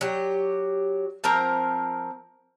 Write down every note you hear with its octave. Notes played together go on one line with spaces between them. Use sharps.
F#3 G4
F3 C4 A#4 A#5